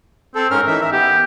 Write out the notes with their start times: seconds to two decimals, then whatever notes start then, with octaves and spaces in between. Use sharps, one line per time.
0.35 C4 A4
0.51 G#2 C#4 A#4 F6
0.67 E3 D#4 E5
0.81 A#4 E5
0.92 B3 G4